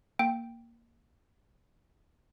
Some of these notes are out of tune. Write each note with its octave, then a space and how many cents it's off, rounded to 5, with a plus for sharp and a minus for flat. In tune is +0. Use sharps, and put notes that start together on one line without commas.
A#3 +0 G5 +0